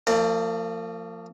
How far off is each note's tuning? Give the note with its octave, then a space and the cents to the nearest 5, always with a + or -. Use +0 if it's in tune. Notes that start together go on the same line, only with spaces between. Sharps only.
F3 +0 A#3 -45 D5 +20